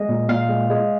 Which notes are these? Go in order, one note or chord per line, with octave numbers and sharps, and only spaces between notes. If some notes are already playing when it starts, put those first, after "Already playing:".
Already playing: G#3 D#5
A#2
A#2 F5
G#3
G#3